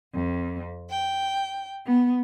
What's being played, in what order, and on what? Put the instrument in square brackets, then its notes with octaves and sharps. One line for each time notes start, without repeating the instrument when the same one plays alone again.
[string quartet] F2
G5
B3